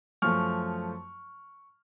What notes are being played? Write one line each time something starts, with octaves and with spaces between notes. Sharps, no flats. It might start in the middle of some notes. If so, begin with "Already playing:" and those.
F#2 F3 A3 C#6 F6